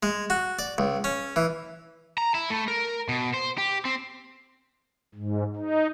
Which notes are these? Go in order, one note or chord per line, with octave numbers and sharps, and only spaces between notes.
G#3
F#4
D5
C#2
C#4
E3
A#5
E4
A3
A#4
B2
C5
G4
C4
G#2
D#4